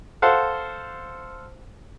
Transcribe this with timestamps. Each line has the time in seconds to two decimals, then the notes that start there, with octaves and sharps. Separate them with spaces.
0.22 A4 C5 F5 F#5